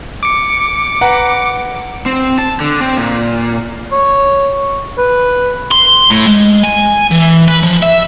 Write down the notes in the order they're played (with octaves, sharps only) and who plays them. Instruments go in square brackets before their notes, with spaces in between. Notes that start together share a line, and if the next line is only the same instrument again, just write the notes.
[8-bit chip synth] D6 C#7
[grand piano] B4 F#5 A#5
[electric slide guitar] C4
A5
D3
C4
A#2
[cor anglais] C#5
B4
[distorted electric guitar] C6
A2
G#3
G#5
E3
B4
F3
E5